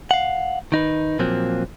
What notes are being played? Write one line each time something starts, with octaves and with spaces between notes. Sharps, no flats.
F5 F#5
D#3 D#4 B4
A#2 F3 F#3 A#3 C4